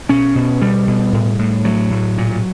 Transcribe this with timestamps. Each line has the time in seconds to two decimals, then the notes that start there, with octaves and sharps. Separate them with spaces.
0.09 B2 C#4
0.35 B2
0.61 B2 G3
0.87 B2
1.13 A2
1.39 A2
1.65 A2 F#3
1.91 A2
2.18 A#2